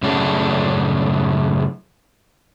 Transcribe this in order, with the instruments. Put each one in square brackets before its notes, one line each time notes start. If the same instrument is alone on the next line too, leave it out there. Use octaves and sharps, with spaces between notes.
[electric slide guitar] F#2 A2 C#3 D4